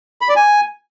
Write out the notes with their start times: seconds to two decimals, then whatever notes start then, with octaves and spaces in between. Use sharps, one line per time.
0.21 B5
0.29 D5
0.36 G#5